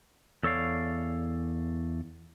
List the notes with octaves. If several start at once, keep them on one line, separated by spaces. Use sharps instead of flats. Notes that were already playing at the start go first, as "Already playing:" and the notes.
E2 A4 C#5 D5 F5